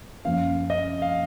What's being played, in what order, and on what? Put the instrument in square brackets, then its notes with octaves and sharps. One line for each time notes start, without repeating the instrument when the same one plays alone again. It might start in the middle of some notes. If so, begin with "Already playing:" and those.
[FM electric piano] F#2 F3 A#3 C#4 [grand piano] F5
[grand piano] D#5
F5